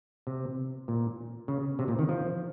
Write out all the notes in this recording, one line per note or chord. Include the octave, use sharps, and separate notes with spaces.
C3
A#2
C#3
C3
A#2
D#3
F3